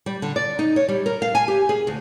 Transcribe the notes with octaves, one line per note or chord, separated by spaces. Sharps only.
G3
D3
D5
D#4
C#5
G3
A#4
F5
G#5
G4
G#4
D2